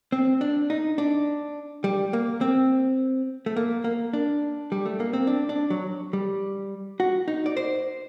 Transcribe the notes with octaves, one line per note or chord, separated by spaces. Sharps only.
C4
D4
D#4
D4
G3
A#3
C4
A3
A#3
A#3
D4
G3
A3
A#3
C4
D4
D4
F#3
G3
F#4
D#4
D5
C5